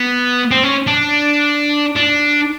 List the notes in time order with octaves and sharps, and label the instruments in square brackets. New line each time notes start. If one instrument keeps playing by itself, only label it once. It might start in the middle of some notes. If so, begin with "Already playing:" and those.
Already playing: [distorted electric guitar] B3
C4
C#4
D4
D4